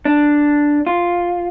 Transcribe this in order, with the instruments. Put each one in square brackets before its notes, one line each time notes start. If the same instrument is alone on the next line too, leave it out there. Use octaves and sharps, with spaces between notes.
[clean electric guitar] D4
F4